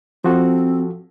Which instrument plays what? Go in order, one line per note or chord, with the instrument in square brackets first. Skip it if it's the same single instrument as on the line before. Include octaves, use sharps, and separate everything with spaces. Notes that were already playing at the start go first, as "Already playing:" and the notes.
[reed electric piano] F3 F#4 A4 [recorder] C4